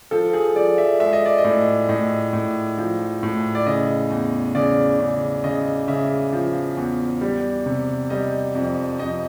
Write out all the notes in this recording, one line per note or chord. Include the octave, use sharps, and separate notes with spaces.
F3 A4
G#4
F3 D5
E5
G#3 E5
D#5
D5
D#5
A2
A2 D#5
A2
F3
A2
D5
C#3 D#5
E2
C#3 D5
C#3
C#3 D#5
C#3 E5
F3
E2
G3
C3
G3 D#5
F2
F2 D#5